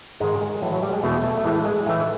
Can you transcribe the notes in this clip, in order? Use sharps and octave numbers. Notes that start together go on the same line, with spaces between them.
G#2 D#3 G#3
G#3
A2 E3 F#3
F#3
G3
G#3
E2 B2 A3
A3
A3
A2 E3 G#3
G#3
A2 E3 A3